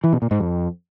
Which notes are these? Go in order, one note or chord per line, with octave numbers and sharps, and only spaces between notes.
E3
B2
A#2
G#2
F2